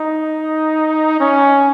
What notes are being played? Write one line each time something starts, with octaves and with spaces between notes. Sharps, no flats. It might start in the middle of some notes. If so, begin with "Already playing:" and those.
Already playing: D#4
C#4